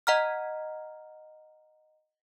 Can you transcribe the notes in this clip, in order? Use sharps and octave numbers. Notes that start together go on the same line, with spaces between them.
D#5 F#5 A#5 F6